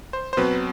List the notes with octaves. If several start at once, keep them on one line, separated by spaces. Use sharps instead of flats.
C5
C5
B2 F#3 C4 B4